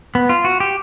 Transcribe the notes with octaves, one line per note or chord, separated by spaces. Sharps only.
B3
F4
F#4
G4